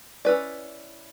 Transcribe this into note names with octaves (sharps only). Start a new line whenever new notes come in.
C#4 E4 B4 D5